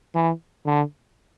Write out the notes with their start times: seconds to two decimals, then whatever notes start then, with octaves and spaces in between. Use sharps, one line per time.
0.15 E3
0.66 D3